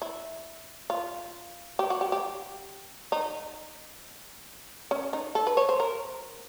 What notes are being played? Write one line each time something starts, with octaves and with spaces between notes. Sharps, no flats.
E4
F4
G4
F#4
G4
G4
D#4
C#4
D#4
A4
B4
C#5
C5
A#4